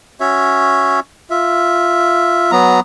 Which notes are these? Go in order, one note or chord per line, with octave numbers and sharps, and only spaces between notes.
C#4 F#4 C#5 E5
F4 E5
F#3 B3 A#5